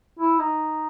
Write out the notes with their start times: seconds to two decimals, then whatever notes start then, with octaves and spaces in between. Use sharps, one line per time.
0.19 E4
0.39 D#4